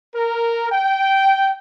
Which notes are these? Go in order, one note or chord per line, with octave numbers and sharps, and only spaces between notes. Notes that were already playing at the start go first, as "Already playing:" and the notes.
A#4
G5